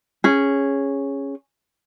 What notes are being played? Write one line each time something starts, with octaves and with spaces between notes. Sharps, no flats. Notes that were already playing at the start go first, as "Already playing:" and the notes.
C#4 G#4